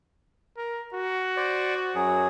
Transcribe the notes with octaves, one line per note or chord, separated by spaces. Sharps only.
A#4
F#4
C5 D5
F#2 F#3 G#4